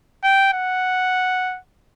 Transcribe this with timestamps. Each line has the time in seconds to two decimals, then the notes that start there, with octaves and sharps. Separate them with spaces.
0.24 G5
0.54 F#5